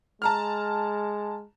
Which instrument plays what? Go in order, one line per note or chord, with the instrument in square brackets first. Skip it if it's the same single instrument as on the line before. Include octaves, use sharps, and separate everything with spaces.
[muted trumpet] G#3 [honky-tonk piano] A5 A#5 F6